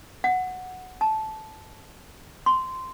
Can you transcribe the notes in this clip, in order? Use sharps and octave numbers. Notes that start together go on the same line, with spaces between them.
F#5
A5
C6